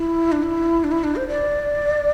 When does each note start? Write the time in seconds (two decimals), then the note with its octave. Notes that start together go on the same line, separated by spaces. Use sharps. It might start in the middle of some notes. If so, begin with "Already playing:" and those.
Already playing: E4
0.32 D4
0.43 E4
0.84 D4
0.92 E4
1.04 D4
1.16 C5
1.28 D5